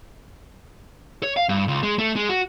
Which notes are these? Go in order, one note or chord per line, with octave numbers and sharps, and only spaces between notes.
C#5
F5
G2
C#2
G#3
A3
G#3
F#4